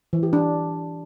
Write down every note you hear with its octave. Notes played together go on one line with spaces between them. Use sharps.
E3
G4
D4